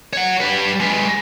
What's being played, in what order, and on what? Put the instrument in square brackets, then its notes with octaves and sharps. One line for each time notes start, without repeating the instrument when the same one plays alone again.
[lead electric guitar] C#5 F#5
G3 B4
G#3 B4